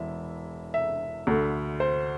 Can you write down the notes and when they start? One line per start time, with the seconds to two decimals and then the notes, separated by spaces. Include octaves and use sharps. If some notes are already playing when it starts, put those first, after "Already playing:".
Already playing: E1 E3 E5
0.74 E5
1.27 D2 D3
1.80 C5